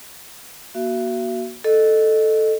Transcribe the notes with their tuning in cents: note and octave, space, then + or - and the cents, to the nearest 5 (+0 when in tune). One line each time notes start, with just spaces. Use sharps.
A#3 +35 F#4 +10 E5 +40
A4 +0 D#5 -20